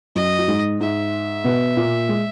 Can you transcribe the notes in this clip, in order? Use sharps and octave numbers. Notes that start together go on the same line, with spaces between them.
F#2 F#3 D#5
F#3
G#2 G#3
G#2 G#3 E5
B2 B3
A#2 A#3
G#3